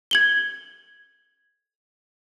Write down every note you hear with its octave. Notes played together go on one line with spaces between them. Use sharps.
G#6 F#7 G7